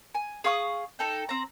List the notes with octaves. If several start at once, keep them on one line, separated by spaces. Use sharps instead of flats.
G#5
G#4 F5 C#6 D#6
D#4 A4 G5
C4 A#5